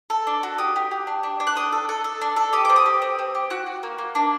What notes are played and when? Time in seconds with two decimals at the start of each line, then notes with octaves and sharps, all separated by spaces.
0.10 A4
0.27 D4
0.43 F#4
0.58 G4 D#6
0.76 G4
0.91 G4
1.07 D4
1.23 D4
1.40 D4
1.47 F#6
1.55 A4 D#6
1.72 A4
1.89 A4
2.04 A4
2.21 D4
2.36 A4
2.53 G4 D#6
2.65 C4 D6
2.76 D#6
2.86 G4
3.02 C4
3.19 C4
3.35 G4
3.50 F#4 F#6
3.66 F#4
3.83 A#3
3.98 A#3
4.15 D4